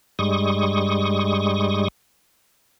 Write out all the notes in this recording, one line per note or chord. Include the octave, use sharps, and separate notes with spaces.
G2 G3 G#3 C#6 D#6